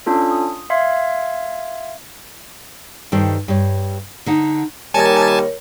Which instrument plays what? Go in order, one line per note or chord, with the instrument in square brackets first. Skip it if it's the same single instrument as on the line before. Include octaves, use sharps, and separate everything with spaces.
[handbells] C#4 D4 F4 A4
D#6
E5 F5 C6 G#6
[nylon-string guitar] G2 D#3 A4 C5
G2 C#5
D3 D#4 F#5
[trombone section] D#2 D#3 G3 [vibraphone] A#4 C#5 [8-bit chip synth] G#5 A5